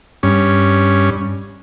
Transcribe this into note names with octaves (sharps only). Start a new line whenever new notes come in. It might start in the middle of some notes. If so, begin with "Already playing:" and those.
G2 C#4